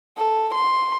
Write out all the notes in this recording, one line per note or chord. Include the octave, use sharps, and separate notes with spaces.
A4
C6